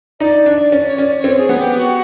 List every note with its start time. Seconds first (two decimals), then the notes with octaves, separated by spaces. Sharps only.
0.20 D#4 D5
0.46 D4
0.60 D5
0.72 C#4
0.87 C#5
0.98 C#4 D5
1.18 C#5
1.24 C4
1.37 G#4
1.49 B3
1.57 G4
1.76 F#4